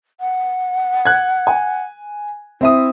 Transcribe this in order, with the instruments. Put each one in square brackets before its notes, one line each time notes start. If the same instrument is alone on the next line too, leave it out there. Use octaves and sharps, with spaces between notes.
[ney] F#5
[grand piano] F#6 G#6
G#5
[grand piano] C4 E5 D#6 [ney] E4